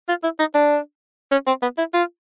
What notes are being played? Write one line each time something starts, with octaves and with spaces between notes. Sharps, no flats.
F4
E4
D#4
D4
C#4
C4
B3
E4
F4